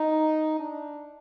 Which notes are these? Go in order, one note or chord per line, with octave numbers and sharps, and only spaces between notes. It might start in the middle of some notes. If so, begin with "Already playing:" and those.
Already playing: D#4
D4